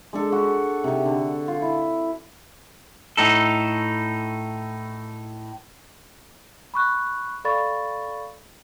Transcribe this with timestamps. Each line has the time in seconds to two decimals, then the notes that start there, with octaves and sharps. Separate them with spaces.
0.13 G#3 D4 A4
0.32 F#4
0.84 C3 D#4
1.06 D3
1.48 F4
1.62 E4
3.17 A2 D#4 A4
6.74 B5 C#6 F#6
7.44 A4 D5 F5 B5 C#6 A6